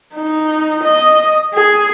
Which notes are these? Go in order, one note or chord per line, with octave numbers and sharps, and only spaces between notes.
D#4
D#5
G#4